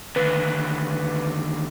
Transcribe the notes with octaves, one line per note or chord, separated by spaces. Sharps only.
D#2 D3 B4